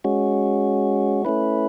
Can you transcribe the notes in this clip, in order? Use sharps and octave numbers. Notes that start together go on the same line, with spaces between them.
G#3 C#4 F#4
A3 C#4 E4 B4